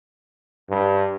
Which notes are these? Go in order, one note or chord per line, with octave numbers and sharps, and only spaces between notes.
G2